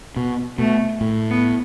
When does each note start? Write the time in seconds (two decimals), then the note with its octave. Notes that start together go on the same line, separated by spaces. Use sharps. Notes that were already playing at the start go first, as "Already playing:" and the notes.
0.16 B2
0.59 B2 A3
1.01 A2
1.30 B3